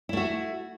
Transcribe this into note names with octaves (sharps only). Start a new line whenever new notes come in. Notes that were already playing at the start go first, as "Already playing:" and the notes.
A3 E4 F#4